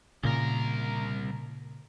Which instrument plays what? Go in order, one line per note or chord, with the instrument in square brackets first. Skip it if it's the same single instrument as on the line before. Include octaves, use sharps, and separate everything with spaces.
[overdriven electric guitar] C2 A#4 [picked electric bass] A#2 C#3